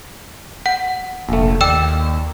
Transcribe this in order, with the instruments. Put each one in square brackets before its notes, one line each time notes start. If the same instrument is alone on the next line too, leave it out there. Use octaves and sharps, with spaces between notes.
[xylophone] F#5
[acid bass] F1 [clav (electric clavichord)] A#1 A3
[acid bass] D#2 [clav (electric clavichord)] D5 [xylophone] G5 E6 E7